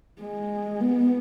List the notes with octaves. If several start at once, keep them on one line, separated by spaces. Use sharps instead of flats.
G#3
B3